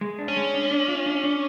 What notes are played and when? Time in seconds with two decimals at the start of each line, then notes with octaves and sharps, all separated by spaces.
0.01 G#3
0.19 D4
0.28 C#4
0.37 G#3
0.54 D4
0.71 D4
0.88 F4
1.06 D4
1.24 D4